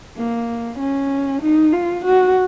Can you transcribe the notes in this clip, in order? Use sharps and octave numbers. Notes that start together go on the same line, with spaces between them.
A#3
C#4
D#4
F4
F#4